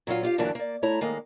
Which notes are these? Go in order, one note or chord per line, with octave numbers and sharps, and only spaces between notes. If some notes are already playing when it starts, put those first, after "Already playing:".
A#2 F#3 C#4 F4
F4 G4 F5
D2 G2 E3 F#3 A#3 D4
A#3 D5
A3 E4 C#5 A#5
D#3 G#3 A#3